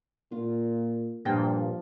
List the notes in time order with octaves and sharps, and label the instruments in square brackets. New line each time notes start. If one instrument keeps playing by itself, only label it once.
[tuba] A#2 [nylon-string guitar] F4
[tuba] G2 [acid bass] A#2 [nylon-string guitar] F3 G5